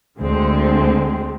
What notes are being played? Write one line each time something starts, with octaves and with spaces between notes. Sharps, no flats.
D2 D3 G#3 C4